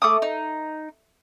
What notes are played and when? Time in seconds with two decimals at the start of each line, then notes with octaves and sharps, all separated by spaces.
0.02 A3 D6 D#6
0.22 D#4